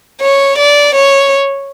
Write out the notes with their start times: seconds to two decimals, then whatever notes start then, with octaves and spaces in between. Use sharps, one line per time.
0.21 C#5
0.58 D5
0.95 C#5